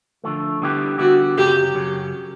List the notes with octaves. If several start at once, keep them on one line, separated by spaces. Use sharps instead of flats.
D3 F3 A3
D3 G3 B3 E4 G4
D3 G3 B3 E4 F#4 G4
F#2 C#3 F#3 G4
F#2 C#3 F#3